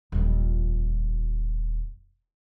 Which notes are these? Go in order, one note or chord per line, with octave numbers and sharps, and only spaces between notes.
D#1 F2